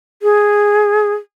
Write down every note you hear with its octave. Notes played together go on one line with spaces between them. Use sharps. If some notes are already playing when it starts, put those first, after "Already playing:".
G#4